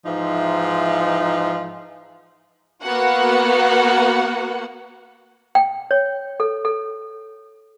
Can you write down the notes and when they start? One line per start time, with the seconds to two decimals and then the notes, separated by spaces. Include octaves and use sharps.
0.05 G#2 E3 F3 D#4 E5
2.82 A#3 B3 F#4 F#5
5.55 G5
5.91 C#5
6.40 A4
6.65 A4